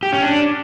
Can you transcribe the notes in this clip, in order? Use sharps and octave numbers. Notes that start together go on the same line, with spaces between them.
G4
C#4
D4